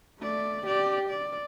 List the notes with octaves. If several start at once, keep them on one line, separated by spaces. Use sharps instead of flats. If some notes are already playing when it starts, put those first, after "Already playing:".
A3 D5
G4 D5
D5